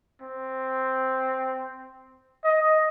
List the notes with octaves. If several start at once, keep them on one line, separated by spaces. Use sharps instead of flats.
C4
D#5